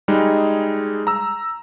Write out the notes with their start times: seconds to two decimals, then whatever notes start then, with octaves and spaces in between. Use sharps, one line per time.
0.08 G3 G#3 D#4 G#4
1.07 A#5 E6